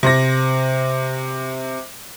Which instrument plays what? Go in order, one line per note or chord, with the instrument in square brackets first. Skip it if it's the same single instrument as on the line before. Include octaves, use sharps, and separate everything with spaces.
[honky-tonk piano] C3 A#6